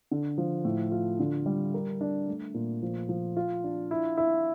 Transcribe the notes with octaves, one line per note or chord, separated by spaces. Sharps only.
D3
F3
A2
F4
D3
G3
A#4
D4
A3
A#2
F3
F3
F4
D4
E4
E4